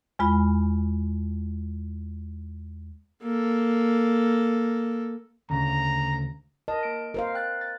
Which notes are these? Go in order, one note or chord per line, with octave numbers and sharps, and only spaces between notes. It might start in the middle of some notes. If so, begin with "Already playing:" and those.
E2 G#3 F4 B5
A#3 A4
D2 C#3 A#5
A#4 D#5 A5
A#3 D7
A#4 C5 F5
G5 F#6 A6
A6